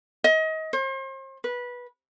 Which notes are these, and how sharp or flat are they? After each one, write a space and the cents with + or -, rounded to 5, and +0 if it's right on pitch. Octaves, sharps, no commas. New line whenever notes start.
D#5 +30
C5 +40
B4 -15